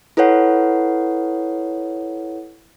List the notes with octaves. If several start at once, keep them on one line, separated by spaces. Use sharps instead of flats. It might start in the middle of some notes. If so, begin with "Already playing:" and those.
E4 A4 B4 C#5 F#5